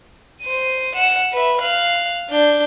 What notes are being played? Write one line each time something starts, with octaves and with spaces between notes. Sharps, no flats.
C5 D#7
F#5 E7
B4 E5
F5 F#6
D4 G6